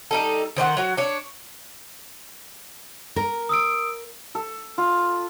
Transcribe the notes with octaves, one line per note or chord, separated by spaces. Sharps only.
G3 D#4 A4
D#3 C5 D5 F#5
F#3 F#4
D4 C#5
A#4
D#6 E6 D7
A4
F4